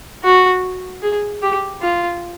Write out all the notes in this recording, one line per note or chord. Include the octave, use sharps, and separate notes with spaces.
F#4
G#4
G4
F4